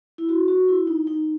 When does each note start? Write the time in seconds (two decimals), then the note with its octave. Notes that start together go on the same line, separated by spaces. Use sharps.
0.18 E4
0.29 F#4
0.48 F#4
0.68 E4
0.87 D#4
1.07 D#4